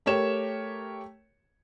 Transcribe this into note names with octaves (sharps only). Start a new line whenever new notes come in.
A3 G4 A#4 C#5 E7